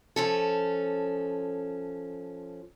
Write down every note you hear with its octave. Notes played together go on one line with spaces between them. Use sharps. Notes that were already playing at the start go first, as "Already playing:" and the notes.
F3 C#4 A4